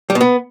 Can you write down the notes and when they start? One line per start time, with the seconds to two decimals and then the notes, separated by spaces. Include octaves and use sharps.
0.10 G3
0.15 B2
0.21 B3